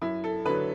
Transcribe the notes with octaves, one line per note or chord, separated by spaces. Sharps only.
F#2 E4
A4
D3 F#3 B4